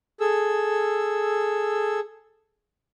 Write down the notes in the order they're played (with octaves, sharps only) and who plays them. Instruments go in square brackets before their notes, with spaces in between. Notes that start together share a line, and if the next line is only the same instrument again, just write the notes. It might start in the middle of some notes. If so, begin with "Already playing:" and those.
[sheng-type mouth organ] G#4 A4 E6